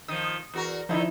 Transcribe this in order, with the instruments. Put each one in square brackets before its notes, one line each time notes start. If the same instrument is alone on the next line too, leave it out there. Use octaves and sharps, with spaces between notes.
[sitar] D#3 F3 [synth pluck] D#6
[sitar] E2 F#4 A#4
[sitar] D3 D#3 [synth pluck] F3 D#4 E4